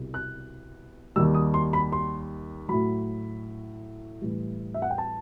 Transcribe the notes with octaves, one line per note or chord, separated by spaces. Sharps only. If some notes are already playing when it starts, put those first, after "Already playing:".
Already playing: C2 B2 G3
F#6
D#2 D#3 G3 E6
D#6
C6
B5
C6
A2 F#3 B5
A2 E3 G3
E5
F#5
G5
A5